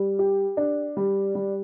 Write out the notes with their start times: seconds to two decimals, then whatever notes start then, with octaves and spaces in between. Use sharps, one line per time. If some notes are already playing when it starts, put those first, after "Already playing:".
Already playing: G3
0.19 G4
0.57 D4
0.97 G3
1.35 G3